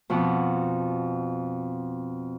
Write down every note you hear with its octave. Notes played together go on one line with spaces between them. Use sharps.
F2 B2 F#5